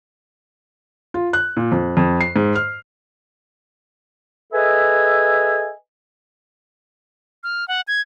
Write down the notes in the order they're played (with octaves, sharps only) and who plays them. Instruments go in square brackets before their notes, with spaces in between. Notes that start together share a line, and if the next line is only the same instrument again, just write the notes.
[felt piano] F4
F#6
A#2
F2
F2
C7
G#2
F6
[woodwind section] G#4 A4 B4 D#5 E5 G#5
[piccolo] F6
F#5
G#6